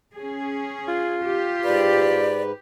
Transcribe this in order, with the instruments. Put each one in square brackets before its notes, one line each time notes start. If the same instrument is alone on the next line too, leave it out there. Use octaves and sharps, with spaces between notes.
[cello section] C#4 G#4
[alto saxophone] F4
[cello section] G4
[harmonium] G#2 B4 [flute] D5